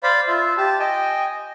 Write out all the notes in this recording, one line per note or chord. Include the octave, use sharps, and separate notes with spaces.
C5 D5 F5 B5
F4 E5
G4 A5
D#5 G5 G#5